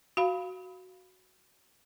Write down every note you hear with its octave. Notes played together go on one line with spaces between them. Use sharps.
F#4 F5 B5